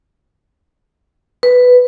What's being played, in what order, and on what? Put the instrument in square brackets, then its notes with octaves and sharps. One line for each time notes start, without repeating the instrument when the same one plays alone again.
[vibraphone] B4